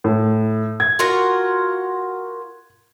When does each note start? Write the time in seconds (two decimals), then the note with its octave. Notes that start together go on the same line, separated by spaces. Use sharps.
0.04 A2
0.80 G#6
0.99 F4 F#4 A#4